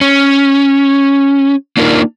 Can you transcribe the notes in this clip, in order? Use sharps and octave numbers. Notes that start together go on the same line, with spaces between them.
C#4
A#3 D4 D#4 F4 A#4